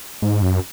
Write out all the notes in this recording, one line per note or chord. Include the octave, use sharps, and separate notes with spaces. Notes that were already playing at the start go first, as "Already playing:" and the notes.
G#2
F#2